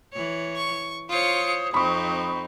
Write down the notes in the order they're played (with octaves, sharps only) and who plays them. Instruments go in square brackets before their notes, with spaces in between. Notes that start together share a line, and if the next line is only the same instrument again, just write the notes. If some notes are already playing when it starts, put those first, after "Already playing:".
[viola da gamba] E3 C#5
[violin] C#6
[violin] F4 C#7 [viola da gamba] C5 C#5 [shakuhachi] D#6
[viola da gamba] F2 D#4 [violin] C4 [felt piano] B5 C#6